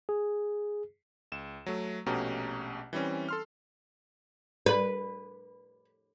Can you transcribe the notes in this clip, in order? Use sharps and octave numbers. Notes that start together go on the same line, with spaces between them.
G#4
C#2 E7
F#3 A3
A#1 B2 A3 C#4 G4 A#5
E3 G3 C4 C#4
A4 C6 F6
B4